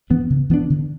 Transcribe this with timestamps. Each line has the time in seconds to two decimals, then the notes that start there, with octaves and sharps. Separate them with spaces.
0.10 E3 B3 D4
0.30 C#3
0.50 E3 B3 D4
0.70 D3